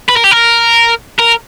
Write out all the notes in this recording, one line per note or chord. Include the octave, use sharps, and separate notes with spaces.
B4
A#4
G4
A#4
A#4